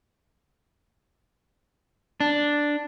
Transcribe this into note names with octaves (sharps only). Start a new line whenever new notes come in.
D4